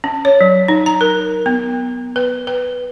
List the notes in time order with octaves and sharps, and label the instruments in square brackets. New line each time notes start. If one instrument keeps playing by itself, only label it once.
[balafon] C#4
C#5
F#3
D#4
A#5
A#4
B3
B4
B4